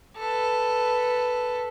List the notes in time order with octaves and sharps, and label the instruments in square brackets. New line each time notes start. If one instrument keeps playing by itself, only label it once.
[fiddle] A4 B4